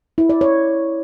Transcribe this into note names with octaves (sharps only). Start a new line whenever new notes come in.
E4
D5
C#5